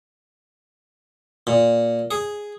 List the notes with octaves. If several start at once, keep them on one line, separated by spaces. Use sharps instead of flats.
A#2
G#4